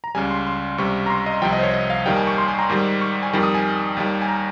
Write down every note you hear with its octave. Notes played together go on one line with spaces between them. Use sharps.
A#5
C#2 C#3 G3 G#5
C6
C6
C#2 C3 G3 C#6
A#5
C6
D#5
C2 C3 F3 G5
D#5
C5
C#5
D#5
F5
D#2 D#3 G3 G5
G#5
C#6
C6
G#5
A#5
G#2 D#3 G3
C#6
G#5
F2 D#3 G3
D#6
G#5
D#2 D#3 G3
G#5
A#5